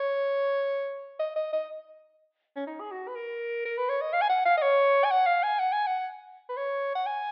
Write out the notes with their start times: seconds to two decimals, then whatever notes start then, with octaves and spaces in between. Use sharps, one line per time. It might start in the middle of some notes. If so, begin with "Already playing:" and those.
Already playing: C#5
1.20 D#5
1.36 D#5
1.53 D#5
2.56 C#4
2.67 D#4
2.80 G#4
2.92 F#4
3.08 B4
3.15 A#4
3.65 A#4
3.78 B4
3.89 C#5
4.01 D#5
4.13 F5
4.22 G#5
4.29 F#5
4.46 F5
4.58 D#5
4.62 C#5
5.04 G#5
5.11 F#5
5.27 F5
5.43 G#5
5.59 F#5
5.72 G#5
5.87 F#5
6.49 B4
6.57 C#5
6.95 F#5
7.06 G#5